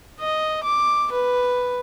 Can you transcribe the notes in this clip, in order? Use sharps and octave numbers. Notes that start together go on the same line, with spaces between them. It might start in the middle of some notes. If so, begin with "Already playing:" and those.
D#5
D6
B4